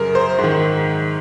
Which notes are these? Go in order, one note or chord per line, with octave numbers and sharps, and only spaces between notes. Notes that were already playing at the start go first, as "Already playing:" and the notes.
Already playing: F#2 C#3 A#4
C5
G#2
D#3